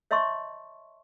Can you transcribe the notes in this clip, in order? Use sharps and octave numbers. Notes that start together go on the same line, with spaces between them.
C#5 D#5 E5 A5 C6 C#6